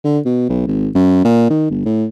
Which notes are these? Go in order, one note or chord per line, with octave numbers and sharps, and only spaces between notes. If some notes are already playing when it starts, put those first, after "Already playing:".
D3
B2
B1
G#1
F#2
A#2
D#3
G1
A2